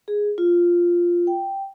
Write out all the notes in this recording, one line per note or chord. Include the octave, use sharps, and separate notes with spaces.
G#4
F4
G5